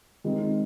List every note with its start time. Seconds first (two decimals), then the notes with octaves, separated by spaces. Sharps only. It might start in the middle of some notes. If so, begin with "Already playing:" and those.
0.24 D#3 G#3 C4 D#4